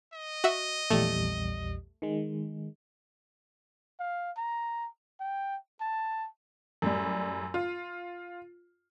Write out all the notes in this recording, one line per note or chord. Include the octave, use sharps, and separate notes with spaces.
D#5
F#4 E5
A#1 E2 G3 A3
D#3 G#3
F5
A#5
G5
A5
F#2 A2 G3
F4